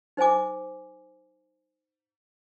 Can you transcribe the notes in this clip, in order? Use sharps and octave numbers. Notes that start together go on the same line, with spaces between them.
D#4 C5 E5 G#5 D6